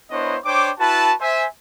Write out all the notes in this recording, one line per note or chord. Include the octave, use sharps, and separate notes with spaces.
B3 D4 E4 C5 C#5 D#5
D4 C5 C#5 G5 D6
E4 F#4 B4 A5
C5 E5 G#5